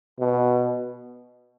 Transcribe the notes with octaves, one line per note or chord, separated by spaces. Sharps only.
B2